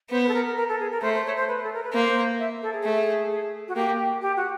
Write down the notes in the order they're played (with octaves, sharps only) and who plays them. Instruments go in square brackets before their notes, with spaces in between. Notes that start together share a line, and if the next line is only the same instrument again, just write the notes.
[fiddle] B3 [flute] C5
[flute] B4
A4
A#4
A#4
A#4
A4
G#4
A#4
[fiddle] A3 [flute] C5
[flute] C5
C#5
C5
B4
A4
A#4
B4
[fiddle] A#3 [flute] C5
[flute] E5
A4
G#4
[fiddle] A3
[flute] F#4
[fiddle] A#3 [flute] G4
[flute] G4
F#4